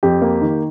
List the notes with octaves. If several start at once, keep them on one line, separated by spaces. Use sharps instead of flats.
F2 G4
A#3
D#3